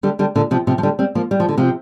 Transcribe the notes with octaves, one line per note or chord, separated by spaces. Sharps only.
D3 G3
D3 G3
A#2 D3
C3 F3
C3 F3
F3
D3 G3
G3 C4
F3 A#3
G3
F3
D3
C3 F3